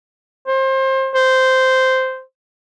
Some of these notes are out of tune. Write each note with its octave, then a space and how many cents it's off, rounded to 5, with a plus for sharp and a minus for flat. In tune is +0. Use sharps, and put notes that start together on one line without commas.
C5 +25
C5 -10